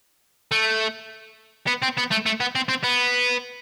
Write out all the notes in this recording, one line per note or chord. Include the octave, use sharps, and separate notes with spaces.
A3
B3
C4
B3
A3
A3
B3
C4
C4
B3